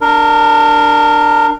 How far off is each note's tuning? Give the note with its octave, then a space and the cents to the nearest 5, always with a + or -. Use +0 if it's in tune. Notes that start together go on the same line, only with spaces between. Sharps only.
D4 +20 A#4 -5